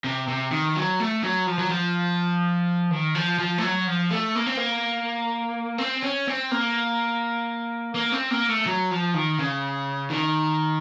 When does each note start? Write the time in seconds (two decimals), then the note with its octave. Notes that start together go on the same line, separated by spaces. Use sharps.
0.04 C3
0.28 C3
0.51 D#3
0.75 F#3
1.00 A3
1.23 F#3
1.47 F3
1.58 F#3
1.70 F3
2.91 D#3
3.15 F3
3.39 F3
3.58 A3
3.63 F#3
3.87 F3
4.10 A3
4.36 A#3
4.46 C4
4.57 A#3
5.78 C4
6.02 C#4
6.27 C4
6.51 A#3
7.95 A#3
8.12 C4
8.31 A#3
8.49 A3
8.66 F#3
8.91 F3
9.14 D#3
9.39 C#3
10.10 D#3